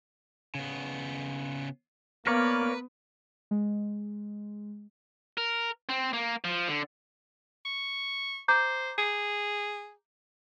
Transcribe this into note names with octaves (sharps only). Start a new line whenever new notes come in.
C#3 B3
A#3 B3 A#4 B4 C#5 D5
G#3
A#4
C4
A#3
F3
D3
C#6
C5 A#5 D6 G6
G#4